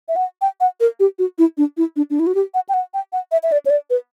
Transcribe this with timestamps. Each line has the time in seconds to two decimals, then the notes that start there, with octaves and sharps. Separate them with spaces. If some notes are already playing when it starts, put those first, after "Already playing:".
0.09 E5
0.16 F#5
0.42 G5
0.61 F#5
0.80 A#4
1.00 G4
1.19 F#4
1.38 E4
1.58 D4
1.77 E4
1.96 D4
2.10 D4
2.19 E4
2.27 F#4
2.35 G4
2.54 F#5
2.69 G5
2.74 F#5
2.94 G5
3.13 F#5
3.32 E5
3.43 E5
3.52 D5
3.66 C#5
3.70 D5
3.90 B4